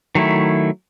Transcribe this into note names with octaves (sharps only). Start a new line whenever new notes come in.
D#3 F#3 A3 E4